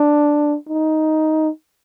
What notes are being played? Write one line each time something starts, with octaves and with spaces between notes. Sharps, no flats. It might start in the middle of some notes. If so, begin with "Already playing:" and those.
Already playing: D4
D#4